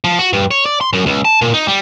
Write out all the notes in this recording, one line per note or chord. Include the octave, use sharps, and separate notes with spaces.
F3
F#4
G2
C#5
D5
C6
F#2
C#2
A5
A#2
D#4
G3